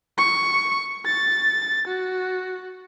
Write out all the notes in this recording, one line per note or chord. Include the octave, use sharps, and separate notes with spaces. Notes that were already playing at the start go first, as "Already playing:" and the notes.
C#6
A6
F#4